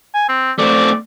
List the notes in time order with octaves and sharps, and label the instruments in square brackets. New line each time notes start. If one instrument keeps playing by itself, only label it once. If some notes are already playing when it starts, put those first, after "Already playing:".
[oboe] G#5
C4
[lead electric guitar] A3 C4 [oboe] D5